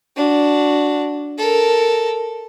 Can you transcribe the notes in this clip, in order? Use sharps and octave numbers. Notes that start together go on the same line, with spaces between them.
D4 F#4
A4 A#4